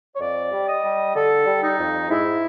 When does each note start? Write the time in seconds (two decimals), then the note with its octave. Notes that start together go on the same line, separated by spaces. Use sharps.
0.14 C#5
0.20 F2 D5
0.52 G3
0.68 D#5
0.83 G3
1.15 D3 A4
1.46 G3
1.62 D#4
1.78 F2
2.09 G#2 E4